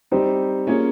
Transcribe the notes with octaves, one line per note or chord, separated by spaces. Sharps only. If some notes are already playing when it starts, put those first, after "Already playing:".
G3 C4 D#4 G4 C5
A#3 C#4 F4 G#4 C#5